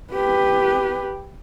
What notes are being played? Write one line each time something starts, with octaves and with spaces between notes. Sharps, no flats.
G4 B4